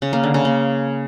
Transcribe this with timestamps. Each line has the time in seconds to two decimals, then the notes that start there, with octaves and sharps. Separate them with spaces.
0.02 C#3
0.13 A#3
0.24 D3
0.34 C#3
0.45 A#3